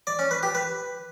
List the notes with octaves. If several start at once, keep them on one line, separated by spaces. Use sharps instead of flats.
D5
C#4
B4
G4
B4